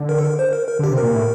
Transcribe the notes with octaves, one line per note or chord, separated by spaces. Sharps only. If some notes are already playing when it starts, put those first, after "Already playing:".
Already playing: D3
A#4
A4
A#4
C5
A#4
A#4
D3
G4
C3
A#2 A#4
A2